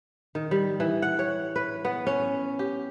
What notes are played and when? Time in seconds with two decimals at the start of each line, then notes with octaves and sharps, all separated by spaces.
0.35 D#3
0.51 G3
0.80 E3
1.02 F#5
1.19 C#5
1.56 B4
1.85 B3
2.07 C#4
2.59 G4